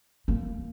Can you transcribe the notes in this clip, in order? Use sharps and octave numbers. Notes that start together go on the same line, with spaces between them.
A#3